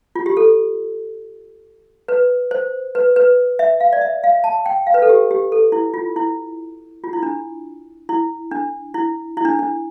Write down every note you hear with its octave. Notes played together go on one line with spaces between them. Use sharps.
F4
G4
A4
B4
C5
B4
B4
E5
F5
D5
E5
F5
A5
G5
F5
B4
A4
G4
G4
A4
E4
F4
E4
F4
E4
D4
E4
D4
E4
E4
D4
D4